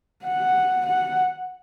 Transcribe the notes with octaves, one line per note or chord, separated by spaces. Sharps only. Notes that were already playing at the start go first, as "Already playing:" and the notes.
F#5
F#5